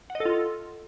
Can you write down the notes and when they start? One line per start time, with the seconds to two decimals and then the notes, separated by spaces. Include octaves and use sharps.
0.10 F#5
0.15 D#5
0.20 A4
0.26 F4